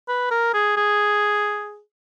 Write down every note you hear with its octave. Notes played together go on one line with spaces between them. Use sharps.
B4
A#4
G#4
G#4